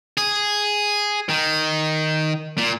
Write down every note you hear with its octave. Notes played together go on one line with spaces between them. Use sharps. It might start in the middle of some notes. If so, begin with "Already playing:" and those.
G#4
D#3
A#2